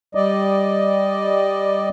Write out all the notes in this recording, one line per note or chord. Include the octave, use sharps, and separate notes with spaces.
G3 D5 D#5